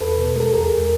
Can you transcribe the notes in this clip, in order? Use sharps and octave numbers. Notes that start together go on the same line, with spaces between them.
E2 A4 B4
B2
G#3 A4 A#4
E2 G#4 A#4
E2